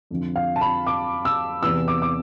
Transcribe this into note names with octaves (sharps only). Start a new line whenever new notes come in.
F2 D3 F3
F5
A5
B5
D6
E6
E2 C3 E3 E6
D6
D6